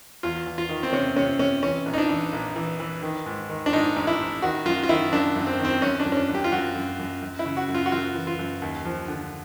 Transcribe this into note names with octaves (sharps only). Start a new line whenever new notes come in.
E2 F4
E2
F4
D#3
C4
C3 C#4
C3 C#4
C3 C#4
E3 C#4
A#1
D#4
D4
E3
A#1
E3
E3
D#3
G#2
D#3
D4
G#2 D#4
A1
E4
A1
D#3 F#4
F#2 F4
F4
D#3 E4
F#2 D4
F#2
C4
D#3
C4
F#2 C#4
D4
F#2
C#4
D4
F#2
G4
F4
F#2 F#4
F#2
F#2
F#2
E4
C#3
F#4
F#2
F4
F#4
F#2 F4
E3
F4
F#2
D#2
F3
D3